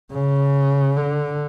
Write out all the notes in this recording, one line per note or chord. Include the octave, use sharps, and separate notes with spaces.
C#3
D3